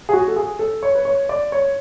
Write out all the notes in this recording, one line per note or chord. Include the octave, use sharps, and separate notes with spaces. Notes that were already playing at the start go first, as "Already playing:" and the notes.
G#4
F#4
A4
G#4
A4
C#5
B4
C#5
D5
C#5